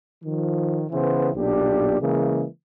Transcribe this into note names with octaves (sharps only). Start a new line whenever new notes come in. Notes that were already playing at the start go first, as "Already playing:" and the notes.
D#3 F3
C#3 E3 B3 C5
B1 A#2 D4 G4
C#3 E3 G#3 A#3